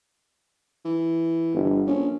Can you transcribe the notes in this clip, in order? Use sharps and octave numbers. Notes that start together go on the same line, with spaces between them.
E3
G1
A#1 C#4